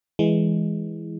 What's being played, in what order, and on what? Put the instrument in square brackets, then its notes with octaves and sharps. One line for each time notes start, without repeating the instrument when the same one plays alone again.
[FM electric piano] E3 G#3